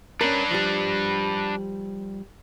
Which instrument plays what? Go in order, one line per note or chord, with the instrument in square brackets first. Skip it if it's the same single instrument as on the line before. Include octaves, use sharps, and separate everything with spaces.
[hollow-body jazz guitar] C#4 A#4 [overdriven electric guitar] D4 B4
[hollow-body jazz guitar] F3 G3